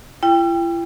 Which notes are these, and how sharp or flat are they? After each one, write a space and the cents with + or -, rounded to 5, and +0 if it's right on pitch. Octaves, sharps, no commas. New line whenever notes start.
E4 +45 G5 +15